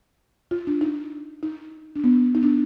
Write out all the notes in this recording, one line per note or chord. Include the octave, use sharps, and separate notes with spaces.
F4
D4
D#4
D#4
D4
B3
D#4
D4